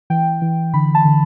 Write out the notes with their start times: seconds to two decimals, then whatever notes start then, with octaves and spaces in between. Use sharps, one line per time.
0.10 E3 G5
0.42 E3
0.74 D3 B5
0.95 A5
1.05 D3